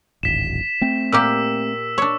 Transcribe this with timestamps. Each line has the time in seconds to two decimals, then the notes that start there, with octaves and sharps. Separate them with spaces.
0.23 D1 G#1 B6 E7
0.81 A3 C4
1.12 A#2 A#3 G4 E6
1.98 D4 C#5